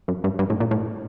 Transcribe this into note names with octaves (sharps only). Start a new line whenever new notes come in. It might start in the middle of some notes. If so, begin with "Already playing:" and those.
F#2
G2
G2
A2
A#2
A2